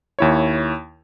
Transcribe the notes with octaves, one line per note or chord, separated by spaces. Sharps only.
D#2 E4 C#5